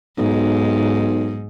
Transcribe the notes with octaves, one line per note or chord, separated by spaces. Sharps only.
B1 G#2